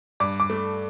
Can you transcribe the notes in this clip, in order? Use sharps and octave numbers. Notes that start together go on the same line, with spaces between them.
G2 D6
D6
A3